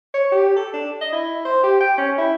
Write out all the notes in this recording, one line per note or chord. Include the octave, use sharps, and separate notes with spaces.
C#5
G4
A4
D4
D#5
E4
C5
G4
G5
C#4
E4